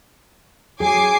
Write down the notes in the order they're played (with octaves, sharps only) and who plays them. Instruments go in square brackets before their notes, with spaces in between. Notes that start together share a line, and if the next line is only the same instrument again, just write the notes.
[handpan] F#3 G#4 [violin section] G#5 D6 C7